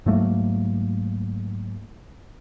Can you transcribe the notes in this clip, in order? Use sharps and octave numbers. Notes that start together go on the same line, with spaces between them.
G#2 F#3 A3 A#3